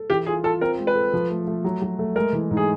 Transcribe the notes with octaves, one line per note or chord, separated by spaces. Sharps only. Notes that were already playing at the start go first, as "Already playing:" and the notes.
Already playing: A4
E3 G4
F4 G#4
F4 A4
C4 A#4
G#3
B4
A4
F3
A3
A3
F#3
F#3
A3
G#3 A#4
E3
G#2
G#4